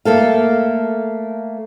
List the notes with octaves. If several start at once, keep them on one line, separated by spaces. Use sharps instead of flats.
A3 A#3 A4 F5